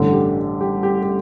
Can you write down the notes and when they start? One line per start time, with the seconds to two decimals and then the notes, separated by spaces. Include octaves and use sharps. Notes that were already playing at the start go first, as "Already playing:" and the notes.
Already playing: A1 G2 D3 A4
0.13 G4
0.61 G4
0.83 G4
1.03 G4